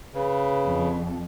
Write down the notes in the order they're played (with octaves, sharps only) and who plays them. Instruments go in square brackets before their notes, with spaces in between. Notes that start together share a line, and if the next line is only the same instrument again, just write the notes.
[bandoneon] C#3 [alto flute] B4
[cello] F2